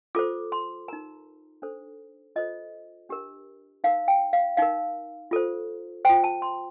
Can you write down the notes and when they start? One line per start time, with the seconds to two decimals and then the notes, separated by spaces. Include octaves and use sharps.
0.15 F4 A4 C5 D6
0.52 C6
0.88 D#4 A#4 A#5
1.62 D4 A4 C5
2.36 F4 A4 C5 D#5
3.09 D4 G4 A#4
3.84 D#4 A#4 F5
4.08 G5
4.33 F5
4.57 D#4 A#4 F5
5.31 F4 A4 C5
6.05 F4 C5 G5
6.24 A5
6.42 C6